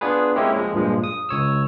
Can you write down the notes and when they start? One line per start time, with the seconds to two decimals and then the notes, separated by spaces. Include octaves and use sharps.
0.01 B3 D4 F4 G#4 B4
0.36 G#3 A#3 C4 C#4 E4 G4
0.56 F3 G#3
0.74 G2 A#2 F3 G#3
1.04 D#6
1.29 C#2 C#5 E6